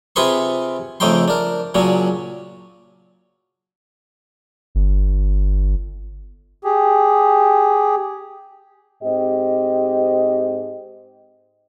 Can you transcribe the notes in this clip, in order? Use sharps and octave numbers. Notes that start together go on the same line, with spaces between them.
C3 F4 G#4 B4 C6 C#6
F2 C#3 A3 D#4 G5 C6
D4 A#4
A#2 C#3 F#3 C#4 D4
G1
G4 G#4
G#2 C4 G4 D#5